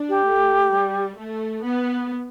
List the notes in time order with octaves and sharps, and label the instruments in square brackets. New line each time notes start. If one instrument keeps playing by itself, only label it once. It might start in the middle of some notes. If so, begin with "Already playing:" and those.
Already playing: [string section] D4
[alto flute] G4
[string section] A3
G3
A3
B3